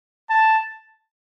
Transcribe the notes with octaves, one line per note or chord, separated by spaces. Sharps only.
A5